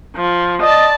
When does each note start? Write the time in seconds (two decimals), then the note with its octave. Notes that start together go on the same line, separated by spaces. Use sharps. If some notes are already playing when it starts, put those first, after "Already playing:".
0.16 F3
0.62 D5 D#5 A5